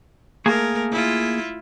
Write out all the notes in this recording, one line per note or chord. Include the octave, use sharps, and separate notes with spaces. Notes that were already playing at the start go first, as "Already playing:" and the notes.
A3 A#3 G#4 A#4
E4 F4